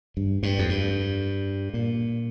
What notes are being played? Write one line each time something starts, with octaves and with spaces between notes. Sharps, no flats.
G2
G2
F2
G2
A#2